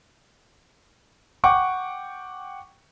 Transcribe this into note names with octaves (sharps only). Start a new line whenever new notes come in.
F#5 G5 C#6 D6